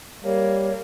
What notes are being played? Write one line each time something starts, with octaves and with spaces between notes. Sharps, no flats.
G3 A#3 C#5